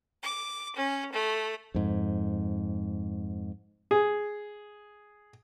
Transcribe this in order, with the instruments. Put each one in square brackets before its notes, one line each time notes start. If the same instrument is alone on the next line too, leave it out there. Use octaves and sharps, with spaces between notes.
[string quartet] D6
C#4
A3
[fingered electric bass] F2 G#2
[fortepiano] G#4